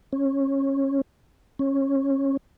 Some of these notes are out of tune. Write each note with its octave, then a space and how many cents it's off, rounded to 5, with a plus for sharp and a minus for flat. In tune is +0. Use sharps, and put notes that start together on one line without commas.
C#4 -20
C#4 -20